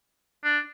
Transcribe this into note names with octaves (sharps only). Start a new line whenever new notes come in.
D4